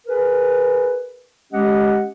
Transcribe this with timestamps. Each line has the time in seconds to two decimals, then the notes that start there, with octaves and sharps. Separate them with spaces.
0.07 G#4 A#4 B4
1.52 G#3 C#4 G4 D#5 F#5